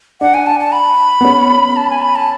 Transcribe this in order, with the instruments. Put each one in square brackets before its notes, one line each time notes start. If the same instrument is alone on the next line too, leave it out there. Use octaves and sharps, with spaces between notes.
[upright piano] D4 [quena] F#5
[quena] G#5
A5
A5
B5
[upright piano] B3
C#4
[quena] A5
G#5
B5
A5